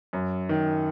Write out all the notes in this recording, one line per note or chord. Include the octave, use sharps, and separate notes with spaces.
F#2
D#3